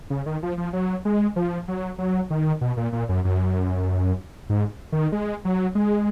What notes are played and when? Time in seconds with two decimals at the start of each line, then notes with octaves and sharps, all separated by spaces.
0.10 C#3
0.26 D#3
0.43 F3
0.58 F3
0.73 F#3
1.05 G#3
1.36 F3
1.68 F#3
1.98 F#3
2.30 D#3
2.61 B2
2.77 A#2
2.93 A#2
3.09 F#2
3.25 F#2
4.50 G#2
4.92 D#3
5.12 G#3
5.45 F#3
5.75 G#3